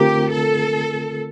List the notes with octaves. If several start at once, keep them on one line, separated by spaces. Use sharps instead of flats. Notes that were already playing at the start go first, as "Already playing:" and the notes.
Already playing: D3 A3 C4 F4 G4 A#4
A4